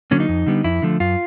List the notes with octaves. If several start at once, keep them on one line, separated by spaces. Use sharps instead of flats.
D3 F#3 A#3 C#4
D#4
F2
D3 G3 B3
F2 E4
D3 F3 A3
F#2 F4